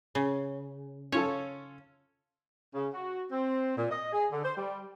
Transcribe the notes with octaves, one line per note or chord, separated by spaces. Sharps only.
C#3
C#4 F4 A4 C#5
C#3
F#4
C4
A#2
D#5
G#4
D3
C5
G3